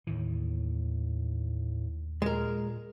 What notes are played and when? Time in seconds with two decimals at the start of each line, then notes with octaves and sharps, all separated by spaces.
0.07 D#2 A2 D#3 E3
2.22 A#2 G#3 A#4